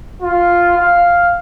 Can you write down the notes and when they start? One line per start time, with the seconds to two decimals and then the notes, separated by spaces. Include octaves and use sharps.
0.22 F4
0.78 F5